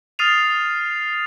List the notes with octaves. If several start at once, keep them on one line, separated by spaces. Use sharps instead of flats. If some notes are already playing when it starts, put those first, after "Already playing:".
D#6 F6 A6 C7 D#7 F7